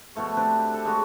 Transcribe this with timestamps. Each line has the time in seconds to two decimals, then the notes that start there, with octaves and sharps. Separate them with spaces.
0.15 B2 F3 A3 C#5
0.37 C4 D4 G4 B4
0.59 G4
0.74 A4
0.85 G#3 C4 D4 F#4